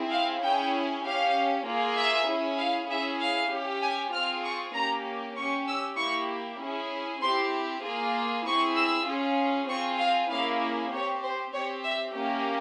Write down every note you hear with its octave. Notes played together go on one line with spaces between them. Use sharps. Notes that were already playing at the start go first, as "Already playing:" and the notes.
Already playing: C4 E4 G#4
F5
C#4 E4 G#4 G5
C#4 G4 F5
A#3 F4 G#4
E5
C#4 E4 G#4
F5
C#4 E4 G#4 E5
F5
C#4 G4
G#5
C4 F4 G#4 F6
C#6
A#3 C#4 G4 A#5
C#4 G4 C#6
E6
A#3 E4 G4 C#6
C#4 E4 G#4
C4 E4 G4 C6
A#3 F4 G#4
C4 E4 G#4 C#6
E6
C#4 F4 G#4
C4 F4 G#4 C#6
F5
A#3 C#4 E4 G#4 F5
C4 G4 C#5
C5
C4 G4 C#5
E5
A#3 C#4 G4